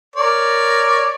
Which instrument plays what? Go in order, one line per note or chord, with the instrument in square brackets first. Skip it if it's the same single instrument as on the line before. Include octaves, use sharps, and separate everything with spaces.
[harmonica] A#4 C#5 D5